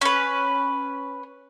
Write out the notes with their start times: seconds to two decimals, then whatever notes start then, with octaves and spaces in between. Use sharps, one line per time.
0.01 C#4 B4